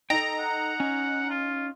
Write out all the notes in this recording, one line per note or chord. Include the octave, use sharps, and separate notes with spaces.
D#4 A4 G5 A#5
F#5
C#4
F4